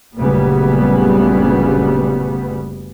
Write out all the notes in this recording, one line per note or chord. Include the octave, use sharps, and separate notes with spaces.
F#1 D2 A#2 C#3 G3 B3